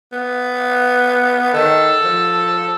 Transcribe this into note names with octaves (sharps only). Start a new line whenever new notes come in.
B3
D#3 A4
F3